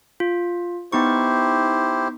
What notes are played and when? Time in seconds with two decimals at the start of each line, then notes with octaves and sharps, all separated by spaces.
0.20 F4
0.92 B3 D#4 E4 G4 C5 C#6